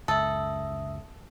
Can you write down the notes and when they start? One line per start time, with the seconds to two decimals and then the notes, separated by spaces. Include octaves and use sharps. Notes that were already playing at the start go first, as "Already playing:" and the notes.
0.08 C#2 F#2 A4 E5 D#6